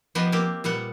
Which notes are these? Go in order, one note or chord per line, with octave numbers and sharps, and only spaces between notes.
F3 B3 G4 B4 D#5
A#3 C4 G4
A#2 G3 B3 F#5